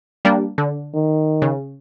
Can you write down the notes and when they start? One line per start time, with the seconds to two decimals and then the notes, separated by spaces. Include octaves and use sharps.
0.25 G3 A#3 D4
0.58 D3
0.94 D#3
1.42 C#3